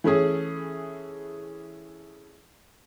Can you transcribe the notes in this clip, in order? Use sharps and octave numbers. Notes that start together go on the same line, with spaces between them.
E3 A3 C#4 G#4